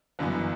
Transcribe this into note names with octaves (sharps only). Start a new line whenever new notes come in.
G1 F#2 E3 B3